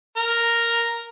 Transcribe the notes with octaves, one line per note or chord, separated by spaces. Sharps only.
A#4